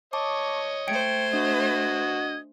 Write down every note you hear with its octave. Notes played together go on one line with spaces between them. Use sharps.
C#5 D#5 A5 C#6 D6
A3 C5 G5 G#6 C#7 D7
D4 F#4 D#5